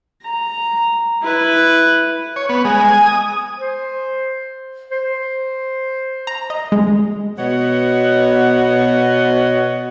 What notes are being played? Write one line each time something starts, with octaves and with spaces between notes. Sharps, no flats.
A#5
E4 B4
C#5
B3
G#3
G#5
D#6
C5
C5
A#5
D#5
G#3
B2 B3 F#4 C#5 D#5 F#5